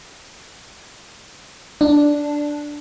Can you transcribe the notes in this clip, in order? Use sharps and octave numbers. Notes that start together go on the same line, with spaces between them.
D4